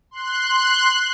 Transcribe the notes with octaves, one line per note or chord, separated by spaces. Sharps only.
C6 F#6